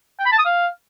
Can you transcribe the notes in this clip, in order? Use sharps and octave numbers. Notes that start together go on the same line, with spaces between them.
G5
B5
A5
D#6
F5